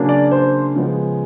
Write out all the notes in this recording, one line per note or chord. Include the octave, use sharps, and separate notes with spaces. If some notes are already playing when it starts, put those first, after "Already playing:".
Already playing: C#3 F#3 A#3 D4
D5
C5
C#3 F3 G#3 B3